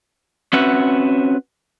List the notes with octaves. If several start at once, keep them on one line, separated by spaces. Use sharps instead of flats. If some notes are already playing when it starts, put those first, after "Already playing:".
C4 C#4 F#4 B4 E5 F#5